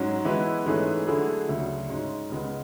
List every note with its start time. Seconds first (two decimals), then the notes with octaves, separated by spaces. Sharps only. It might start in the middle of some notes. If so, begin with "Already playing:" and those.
Already playing: G#2 F#3 C#4
0.25 E3 G#3 B3 E4 B4
0.66 G#2 E3 A3 C#4 G#4
1.07 D3 F#3 A3 E4 G#4
1.49 D2 C#3 F#3
1.89 G#2 G#3 C#4
2.30 C#2 C#3 G#3 B3